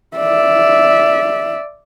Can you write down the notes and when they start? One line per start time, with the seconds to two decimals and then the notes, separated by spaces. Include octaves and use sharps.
0.17 D5 E5